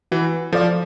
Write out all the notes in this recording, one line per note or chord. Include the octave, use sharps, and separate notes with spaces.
E3 F#4
F3 A4 D5 F5